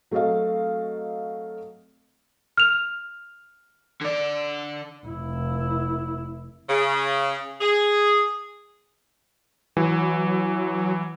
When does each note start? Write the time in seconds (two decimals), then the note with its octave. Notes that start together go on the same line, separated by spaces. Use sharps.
0.11 F#3 A3 C4 A4 D#5 F5
2.57 F6 F7
4.01 D3 D5
5.06 F1 E4
6.69 C#3
7.60 G#4
9.77 E3 F#3